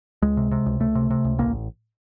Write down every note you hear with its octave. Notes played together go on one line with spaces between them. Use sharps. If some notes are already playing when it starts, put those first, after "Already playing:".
C#2 G#3
C3
C3
C#2
C#2 A3
C3
C3
C#2
A1 A#3